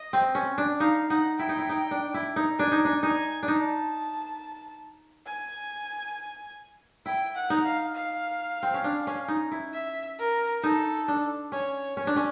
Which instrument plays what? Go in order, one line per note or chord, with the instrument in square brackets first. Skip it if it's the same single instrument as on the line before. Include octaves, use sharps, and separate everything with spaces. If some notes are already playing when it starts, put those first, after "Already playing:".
Already playing: [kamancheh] D#5
[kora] C4
C#4
D4
[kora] D#4 [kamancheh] F5
[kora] D#4 [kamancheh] F#5
[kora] E4 [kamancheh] G5
[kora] D#4
E4
D#4
D4
E4
D#4
[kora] D4 [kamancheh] G#5
[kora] D#4
D4
[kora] D#4 [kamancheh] G#5
[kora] D4
[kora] D#4 [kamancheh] A5
[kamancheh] G#5
[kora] E4 [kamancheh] G5
[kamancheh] F#5
[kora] D#4
[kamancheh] F5
F5
[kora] C4
C#4
D4
C#4
D#4
E4
[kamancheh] E5
A#4
[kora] D#4 [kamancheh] A4
[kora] D4
[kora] C#4 [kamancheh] C#5
[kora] C#4
D4
C#4